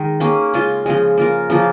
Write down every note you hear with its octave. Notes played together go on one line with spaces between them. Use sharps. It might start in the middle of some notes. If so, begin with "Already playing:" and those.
Already playing: D#3 G#3 D#4
A#3 C#4 G#4
C#3 G#3 F4
C#3 F3 G#3
A#3 F4 A#4
C#3 F3 A#3 F4